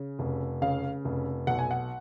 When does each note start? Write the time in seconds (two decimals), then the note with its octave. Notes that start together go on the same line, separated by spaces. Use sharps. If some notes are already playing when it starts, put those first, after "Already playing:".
Already playing: C#3
0.19 F1
0.62 C#3 F5
1.05 F1
1.47 B1 F#5
1.59 G#5
1.71 F#5